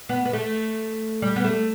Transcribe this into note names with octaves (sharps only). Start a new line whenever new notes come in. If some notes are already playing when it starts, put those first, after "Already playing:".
B3
B3
A3
G3
B3
A3